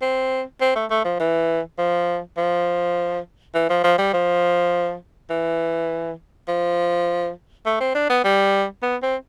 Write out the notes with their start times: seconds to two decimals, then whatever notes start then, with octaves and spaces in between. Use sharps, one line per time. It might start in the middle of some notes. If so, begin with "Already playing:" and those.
0.02 C4
0.61 C4
0.75 A3
0.90 A3
1.05 F3
1.20 E3
1.78 F3
2.37 F3
3.54 E3
3.69 F3
3.84 F3
3.98 G3
4.13 F3
5.30 E3
6.48 F3
7.66 A3
7.80 C4
7.95 D4
8.10 B3
8.24 G3
8.83 B3
9.02 C4